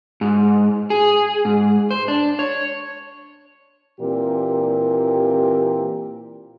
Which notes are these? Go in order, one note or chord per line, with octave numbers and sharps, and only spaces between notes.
G#2
G#4
G#2
C5
D4
C#5
A#2 E3 C4 G4 A#4